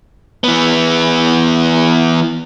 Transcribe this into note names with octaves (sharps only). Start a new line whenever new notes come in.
E3 B3